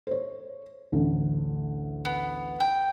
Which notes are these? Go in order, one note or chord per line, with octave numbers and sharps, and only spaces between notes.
C5 C#5
A1 D2
B3
G5